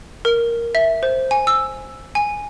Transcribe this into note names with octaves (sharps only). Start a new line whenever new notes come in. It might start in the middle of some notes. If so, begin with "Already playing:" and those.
A#4
E5
C5
G#5
E6
G#5